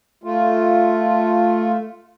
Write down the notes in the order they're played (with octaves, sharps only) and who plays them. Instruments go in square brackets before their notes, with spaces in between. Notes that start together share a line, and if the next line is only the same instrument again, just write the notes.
[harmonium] A3 F4